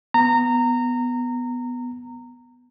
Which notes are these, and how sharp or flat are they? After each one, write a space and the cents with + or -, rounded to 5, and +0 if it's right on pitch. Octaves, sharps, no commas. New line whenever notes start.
B3 +0 A#5 -20